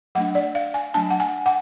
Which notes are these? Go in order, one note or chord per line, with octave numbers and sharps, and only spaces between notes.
F#3 A3 D4 F#5
D5
F5
G#5
F#3 A3 D4 A5
F#5
G#5
F#5